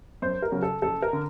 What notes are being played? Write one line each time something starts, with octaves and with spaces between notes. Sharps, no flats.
F#2 C5
A#4
C#3 F#3
A4
F#1 A4
A#4
D3